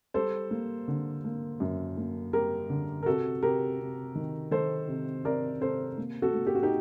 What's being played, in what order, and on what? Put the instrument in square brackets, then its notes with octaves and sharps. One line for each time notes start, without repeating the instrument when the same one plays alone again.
[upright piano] G3 A4 C5
A#3
D3
A#3
F#2
A#3
G3 G4 A#4
D3
A#4
C3 F#4 A4
C3 G4 A#4
C3
D#3
D#3 A4 C5
C3
C3 A#4 D5
C3 A4 C5
A#3
F#4 A4
A#3
G4
F#4
D#4 G4